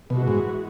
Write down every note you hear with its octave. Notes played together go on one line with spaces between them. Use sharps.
B2 E3 G#3 B3 F#4
G#2